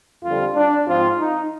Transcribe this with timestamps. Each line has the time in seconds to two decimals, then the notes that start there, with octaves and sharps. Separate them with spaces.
0.24 F2 D3 G3 C4 F4
0.56 D4
0.88 G#2 F3 C4 F4
1.19 D#4